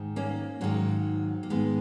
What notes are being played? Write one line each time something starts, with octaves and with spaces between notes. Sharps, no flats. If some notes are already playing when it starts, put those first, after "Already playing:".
Already playing: G#2 D#3
A#3 C#4
G#2 D#3 F#3 A#3
A#3
G#2 D#3 G#3 B3